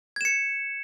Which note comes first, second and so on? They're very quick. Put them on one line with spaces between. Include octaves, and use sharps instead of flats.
G#6 E7 C#7